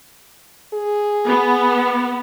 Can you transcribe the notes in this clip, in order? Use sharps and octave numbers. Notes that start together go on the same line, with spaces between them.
G#4
B3